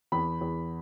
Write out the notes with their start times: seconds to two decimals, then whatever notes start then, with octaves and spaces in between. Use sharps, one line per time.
0.12 E2 B5
0.41 E2